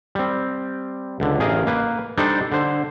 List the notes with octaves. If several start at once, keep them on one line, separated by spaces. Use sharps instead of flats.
G3 C4
C#2 D3
A1 G#4 A#4 D#5 F5
A#3 B4
G3 D4 D#4 A4 C5
D3 C5